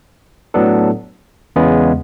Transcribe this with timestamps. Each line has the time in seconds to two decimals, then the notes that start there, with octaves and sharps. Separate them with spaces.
0.54 A2 F#3 B3 D4 A4
1.56 E2 C#3 G#3 B3